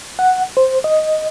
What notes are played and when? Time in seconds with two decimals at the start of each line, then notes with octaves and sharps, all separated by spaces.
0.19 F#5
0.57 C5
0.84 D#5